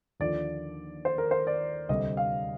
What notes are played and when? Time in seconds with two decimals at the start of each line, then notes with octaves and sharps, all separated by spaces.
0.20 D#2 D3 F3 D5
1.05 C5
1.18 A#4
1.31 C5
1.47 D5
1.89 D2 C3 G3 D#5
2.17 F5